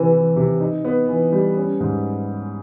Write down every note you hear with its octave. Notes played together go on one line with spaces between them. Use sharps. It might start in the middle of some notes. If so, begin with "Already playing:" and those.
Already playing: C3 E3
E3
C3
D#4
B3
E3
G3
C#4
G#2